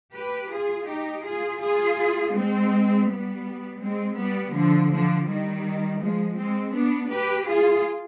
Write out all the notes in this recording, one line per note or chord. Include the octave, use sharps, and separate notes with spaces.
G4 B4
F4 G#4
D#4 G4
F4 G#4
F4 G#4
G#3 C4
G3 B3
G#3 C4
G3 B3
D3 F3
D3 F3
D#3 G3
F3 G#3
G#3 C4
B3 D4
G4 B4
F4 G#4